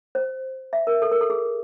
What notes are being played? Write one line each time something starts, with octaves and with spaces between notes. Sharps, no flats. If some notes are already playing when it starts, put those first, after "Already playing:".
C5
E5
A#4
A4
A#4
A4
G#4